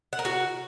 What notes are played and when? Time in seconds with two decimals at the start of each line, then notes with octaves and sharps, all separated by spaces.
0.13 F#5
0.19 A#4
0.25 F#4